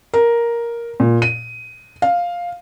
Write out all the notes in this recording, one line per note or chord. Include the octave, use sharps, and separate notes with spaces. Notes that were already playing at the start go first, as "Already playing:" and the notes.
A#4
A#2
D#7
F5